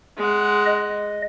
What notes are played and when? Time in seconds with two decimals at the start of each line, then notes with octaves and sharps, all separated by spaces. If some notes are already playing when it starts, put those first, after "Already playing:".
0.17 G#3 F#5
0.66 D#5